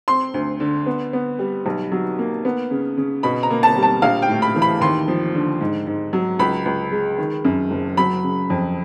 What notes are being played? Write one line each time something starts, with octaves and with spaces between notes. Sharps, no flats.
C4 C6
D2
D3
B3
B3
G3
B1
F#3
A#3
B3
C#3
C#3
B2 B5
A#5
A#3
A5
G3
A5
A#1 F5
G5
A2
B5
E3
B5
D#2 C6
F3
D3
G#2
G#2
F#3
C#2 B5
C#2
G#3
D#3
F#2
F#1
F#3 B5
C#3
F2